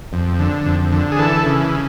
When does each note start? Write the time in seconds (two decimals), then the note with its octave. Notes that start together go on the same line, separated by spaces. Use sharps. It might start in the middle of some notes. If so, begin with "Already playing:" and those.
0.13 F2
0.39 D3
0.66 F2
0.92 D3
1.12 G#4
1.19 E3 A4
1.46 C#3